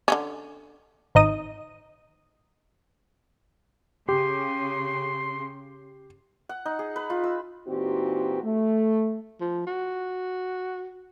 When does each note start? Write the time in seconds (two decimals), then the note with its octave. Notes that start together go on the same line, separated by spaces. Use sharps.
0.08 D3 E3 C#4
1.15 G#1 D#4 D#6
4.09 C#3 G4 C6
6.49 F#5
6.66 D#4
6.79 G#4
6.96 B4
7.10 F4
7.24 E6
7.67 A#2 E3 C4 D#4 F#4 G4
8.43 A3
9.41 F3
9.67 F#4